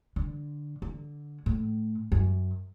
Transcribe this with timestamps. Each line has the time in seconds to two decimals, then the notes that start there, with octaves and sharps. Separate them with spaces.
0.16 D3
0.82 D3
1.46 A2
2.12 F#2